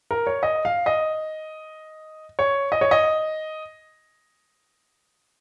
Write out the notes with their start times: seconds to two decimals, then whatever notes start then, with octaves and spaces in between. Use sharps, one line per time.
0.11 A#4
0.27 C#5
0.43 D#5
0.65 F5
0.86 D#5
2.39 C#5
2.72 D#5
2.81 C#5
2.91 D#5